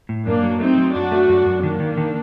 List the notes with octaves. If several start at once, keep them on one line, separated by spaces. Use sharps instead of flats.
A2
F#2 A#3 D4
F#3
A3 C4 D#4
F#3
F#2 D4 F#4
A3
F#2
F#2
D#3 A#3 D4
D#3
D#3